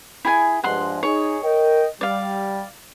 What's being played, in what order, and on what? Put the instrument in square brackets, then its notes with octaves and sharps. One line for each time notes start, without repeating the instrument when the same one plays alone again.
[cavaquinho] E4 G#4 G#5
[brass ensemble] G2 F3 G#3 [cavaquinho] F#5 C6
[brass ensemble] D#4 G#4 [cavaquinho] C#5
[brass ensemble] A#4 D#5 G5
[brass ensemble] G3 [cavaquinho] D5 F5